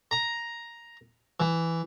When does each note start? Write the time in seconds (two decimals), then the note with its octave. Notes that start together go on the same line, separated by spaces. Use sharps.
0.11 A#5
1.40 E3